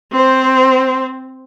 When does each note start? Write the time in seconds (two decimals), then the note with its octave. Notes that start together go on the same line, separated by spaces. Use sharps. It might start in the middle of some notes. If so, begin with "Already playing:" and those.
0.12 C4 C5